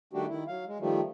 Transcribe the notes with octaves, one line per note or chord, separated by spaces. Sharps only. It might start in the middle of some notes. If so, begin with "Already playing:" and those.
D#3 G3 A3 D4 F#4 G4
D#3 E4
F#3 F5
G#3
D#3 F3 G3 A3